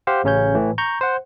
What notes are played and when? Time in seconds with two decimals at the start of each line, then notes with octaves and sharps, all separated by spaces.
0.07 G4 C5 F5 F#5
0.24 A1 C#3 C#4 C#5 G6
0.55 A2 E3
0.78 A#5 C#6 G6
1.01 C5 F#5